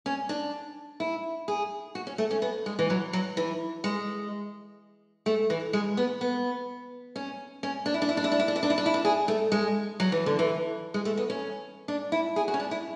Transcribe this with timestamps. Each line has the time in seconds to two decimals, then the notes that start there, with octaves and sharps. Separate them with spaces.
0.06 C#4
0.29 D4
1.00 E4
1.48 G#4
1.95 F#4
2.07 C#4
2.18 A3
2.31 C#4
2.42 B3
2.66 G#3
2.79 E3
2.90 F#3
3.13 F#3
3.37 E3
3.84 G#3
5.26 A3
5.50 E3
5.73 G#3
5.97 B3
6.21 B3
7.16 C#4
7.63 C#4
7.86 D4
7.94 E4
8.02 D4
8.09 E4
8.17 D4
8.24 E4
8.32 D4
8.39 E4
8.48 D4
8.56 E4
8.63 D4
8.70 E4
8.78 D4
8.86 E4
8.94 D4
9.05 G#4
9.28 A3
9.52 G#3
10.00 F#3
10.12 E3
10.26 D3
10.39 E3
10.94 G#3
11.05 A3
11.17 B3
11.30 C#4
11.88 D4
12.12 E4
12.36 G#4
12.48 F#4
12.54 C#4
12.60 D4
12.71 E4